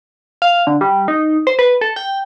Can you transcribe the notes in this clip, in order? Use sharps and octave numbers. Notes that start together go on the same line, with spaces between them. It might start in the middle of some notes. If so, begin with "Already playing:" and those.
F5
D3
G3
D#4
C5
B4
A4
G5